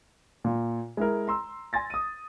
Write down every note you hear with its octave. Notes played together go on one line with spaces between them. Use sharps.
A#2
G#3 E4 A#4
A#5 C6 E6
G#5 C6 A6 A#6
D#6 D#7